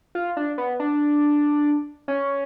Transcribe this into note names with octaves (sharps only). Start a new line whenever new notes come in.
F4
D4
B3
D4
C#4